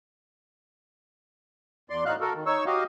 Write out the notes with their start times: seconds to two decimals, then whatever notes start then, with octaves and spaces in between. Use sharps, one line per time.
1.90 E2 D5 C6
2.05 A2 D#4 F#4 F5 F#6
2.20 F#4 A4 A#4
2.34 D#3
2.46 D#4 C#5 C#6 E6
2.66 F#4 G4 D#5 F5